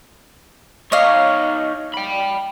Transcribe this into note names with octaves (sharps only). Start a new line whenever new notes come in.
D#4 C#5 D#5 F5
G5 B5